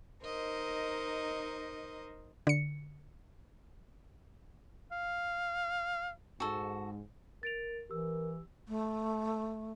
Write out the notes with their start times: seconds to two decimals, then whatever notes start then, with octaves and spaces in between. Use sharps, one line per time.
0.24 D#4 A#4 C5 D#5
2.47 D3 C#7
4.92 F5
6.40 G#2 F#4 A4
7.43 A#4 A6 D7 F7
7.90 E3 G4 A#4 E6
8.68 A3